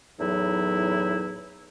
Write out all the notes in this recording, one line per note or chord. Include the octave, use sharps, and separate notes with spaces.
E2 A2 F#3 D#4 E4